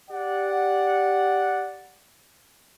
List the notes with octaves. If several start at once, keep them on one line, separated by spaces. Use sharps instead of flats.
G4 D5 F#5